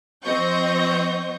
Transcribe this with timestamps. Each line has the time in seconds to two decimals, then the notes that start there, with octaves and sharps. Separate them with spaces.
0.24 F3 C4 C5 D#5 C#6 G6